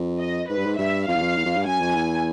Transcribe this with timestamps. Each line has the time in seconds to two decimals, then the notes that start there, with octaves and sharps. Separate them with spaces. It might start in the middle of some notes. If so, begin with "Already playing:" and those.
Already playing: F2
0.19 D#5
0.49 G#2 B4
0.57 G2
0.66 G#2
0.78 G2 E5
1.07 F2 F5
1.15 E2
1.21 F2
1.37 E2
1.45 F2
1.56 G2
1.65 F#2 G#5
1.81 F2
1.95 E2